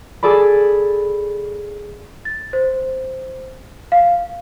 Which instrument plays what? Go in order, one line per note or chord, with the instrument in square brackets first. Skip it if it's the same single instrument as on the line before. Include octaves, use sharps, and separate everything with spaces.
[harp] G#4 A4 D5 B5
[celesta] A6
C5
F5